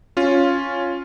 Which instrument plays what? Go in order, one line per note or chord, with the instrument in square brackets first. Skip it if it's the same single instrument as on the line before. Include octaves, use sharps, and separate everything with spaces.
[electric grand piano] C#4 F4